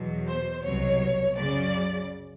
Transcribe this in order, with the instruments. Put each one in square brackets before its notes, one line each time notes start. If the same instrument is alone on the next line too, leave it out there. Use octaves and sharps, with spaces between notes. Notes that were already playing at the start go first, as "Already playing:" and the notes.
Already playing: [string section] E2 B2 F#3
C5
C2 B2 F#3 C#5
F#2 C#3 F#3 D5